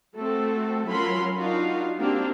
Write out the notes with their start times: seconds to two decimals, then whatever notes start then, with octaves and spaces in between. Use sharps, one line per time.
0.16 A3 C4 F#4 A4
0.87 F#3 C#4 F4 A#4 B5 C6
1.40 D4 D#4 F4 F#4 F5
1.99 A#3 C4 D4 G4